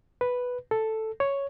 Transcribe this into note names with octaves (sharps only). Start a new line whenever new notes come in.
B4
A4
C#5